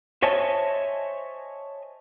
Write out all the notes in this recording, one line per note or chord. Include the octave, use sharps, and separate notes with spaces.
C5 C#5 D#5 E5 G#5 A5